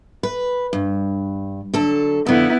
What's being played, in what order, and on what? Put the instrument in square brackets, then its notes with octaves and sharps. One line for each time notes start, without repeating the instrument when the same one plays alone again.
[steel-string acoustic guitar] B4
G2
D3 F#3 A4
[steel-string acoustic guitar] F2 D3 [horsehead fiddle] B3 E4